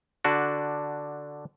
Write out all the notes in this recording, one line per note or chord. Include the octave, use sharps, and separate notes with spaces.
D3 D4 F#4